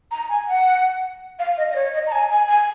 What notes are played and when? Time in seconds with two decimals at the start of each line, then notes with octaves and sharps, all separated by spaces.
0.11 A#5
0.29 G#5
0.47 F#5
1.39 F5
1.57 D#5
1.71 D#5
1.76 C#5
1.94 D#5
2.07 A#5
2.12 G#5
2.30 G#5
2.48 G#5